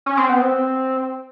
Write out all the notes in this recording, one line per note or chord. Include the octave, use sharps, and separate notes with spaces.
C#4
C4
B3
C4